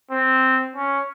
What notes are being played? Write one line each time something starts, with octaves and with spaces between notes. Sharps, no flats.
C4
C#4